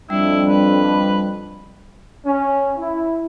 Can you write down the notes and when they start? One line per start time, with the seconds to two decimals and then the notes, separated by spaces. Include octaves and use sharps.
0.10 F2 G3 D4 E4
0.48 B4
2.25 C#4
2.77 E4